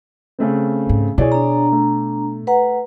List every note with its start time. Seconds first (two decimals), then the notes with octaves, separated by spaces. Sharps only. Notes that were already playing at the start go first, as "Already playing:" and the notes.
0.39 C#3 A3 C4
0.89 G#2
1.18 B2 E4 G#4 C#5 D5
1.32 D4 A#5
1.72 A3
2.47 B4 F#5 A#5